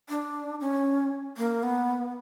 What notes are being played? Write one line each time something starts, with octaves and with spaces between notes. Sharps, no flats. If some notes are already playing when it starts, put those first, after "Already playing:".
D4
C#4
A#3
B3